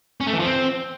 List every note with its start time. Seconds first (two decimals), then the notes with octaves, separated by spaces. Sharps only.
0.21 C#4
0.27 A3
0.33 E3
0.39 F3
0.46 C4